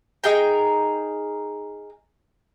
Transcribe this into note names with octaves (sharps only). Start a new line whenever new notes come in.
D#4 G#4 A#4 G5